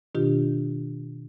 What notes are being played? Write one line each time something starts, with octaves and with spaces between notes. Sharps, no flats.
B2 D#3 D4 F4 G4